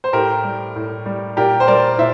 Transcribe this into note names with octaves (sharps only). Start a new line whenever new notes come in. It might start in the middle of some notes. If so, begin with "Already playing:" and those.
C5
A2 G4 A#4
G3
A2
G3
A#2 G4 A#4
C5
G3 A#4 D5
A#2 C5 E5